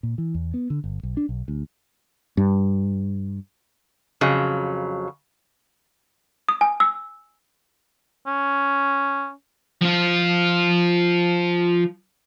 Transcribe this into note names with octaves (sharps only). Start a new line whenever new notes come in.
A#2
E3
E2
B3
D3
G1
B1
D4
B1
D2
G2
F2 C#3 F#3
D#6
G#5
E6
C#4
F3 F4